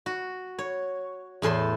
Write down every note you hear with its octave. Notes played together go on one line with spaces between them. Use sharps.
F#4
C#5
E2 A2 A4 C6